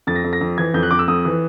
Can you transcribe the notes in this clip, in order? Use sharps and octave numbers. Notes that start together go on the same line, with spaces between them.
F2 A6
A#6
F2
A#6
F2
E3 G#6
F2 G6
F#6
F2 D6
E6
F2 D#6
E3